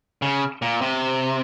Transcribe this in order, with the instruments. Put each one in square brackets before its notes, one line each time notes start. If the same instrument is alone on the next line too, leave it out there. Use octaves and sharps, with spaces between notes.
[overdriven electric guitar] C#3
A#2
C3